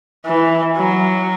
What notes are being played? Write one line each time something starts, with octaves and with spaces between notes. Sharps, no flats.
E3
F#3